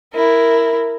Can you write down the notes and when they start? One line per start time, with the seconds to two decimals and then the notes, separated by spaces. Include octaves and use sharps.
0.13 E4 A#4